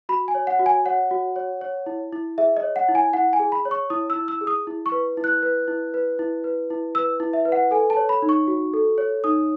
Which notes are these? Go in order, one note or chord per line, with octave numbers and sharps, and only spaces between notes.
F#4 B5
G#5
C#5
F#5
F#4
G#5
C#5 F#5
F#4
C#5
C#5
E4
E4
G#4 E5
D#5
C#5
F#5
E4
G#5
E4 F#5
G#5
G#4
B5
C#5
C#6
E4 D#6
E6
E4
E6
G#4
D#6
E4
C#6
B4
E4
F#6
B4
E4
B4
E4
B4
E4
B4 E6
E4
E5
B4
F#5
A4 G#5
A5
C#5
B5
D#4
C#6
F#4
A4
C#5
D#4 D#6